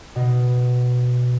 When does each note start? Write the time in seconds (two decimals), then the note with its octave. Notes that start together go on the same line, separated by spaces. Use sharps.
0.15 B2